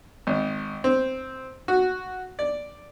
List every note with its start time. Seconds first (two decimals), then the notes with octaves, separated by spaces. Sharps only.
0.27 G#1
0.84 C4
1.68 F#4
2.39 D5